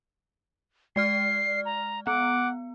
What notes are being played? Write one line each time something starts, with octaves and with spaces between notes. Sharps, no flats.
G#3 D5 F6 C7
A#5
B3 F#5 D6